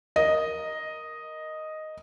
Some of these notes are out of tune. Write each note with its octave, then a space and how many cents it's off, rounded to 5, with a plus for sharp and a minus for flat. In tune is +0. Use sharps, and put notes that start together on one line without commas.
A#4 +0 D#5 +0